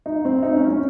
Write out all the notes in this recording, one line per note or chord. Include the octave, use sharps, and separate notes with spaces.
D#4
C4
D#4
C#4
C#4